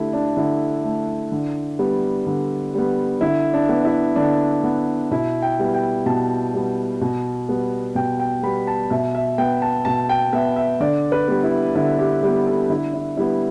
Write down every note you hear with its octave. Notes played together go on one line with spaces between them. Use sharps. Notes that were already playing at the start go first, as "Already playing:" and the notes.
Already playing: D3 A3 E4 G4 A4
D4
D3 E4
A3
D3
G3 B3
D3
G3 B3
D3 E4
D4
B3
E4
D3 D4
B3
B2 E4
G5
G3 B3
G5
B2 A5
G3 B3
B2
G3 B3
B2 G5
G5
G3 B3 B5
A5
B2 E5
E5
B3 G5
A5
B2 A5
G5
B3 E5
E5
D3 D5
B4
G3 B3
E4
D3 E4
G4
G3 B3 G4
A4
D3 E4
E4
G3 B3 E4